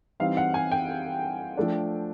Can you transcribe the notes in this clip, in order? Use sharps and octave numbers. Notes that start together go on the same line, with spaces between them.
E3 G3 C4 D#4 F5
F#5
G#5
G5
F3 A3 D4